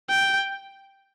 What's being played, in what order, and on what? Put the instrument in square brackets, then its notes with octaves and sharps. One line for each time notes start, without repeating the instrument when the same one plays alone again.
[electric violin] G5